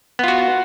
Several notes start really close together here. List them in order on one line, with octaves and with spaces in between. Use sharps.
B3 F4 F#4